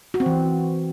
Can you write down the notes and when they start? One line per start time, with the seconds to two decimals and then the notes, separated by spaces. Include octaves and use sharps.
0.14 F#4
0.20 C4
0.26 E3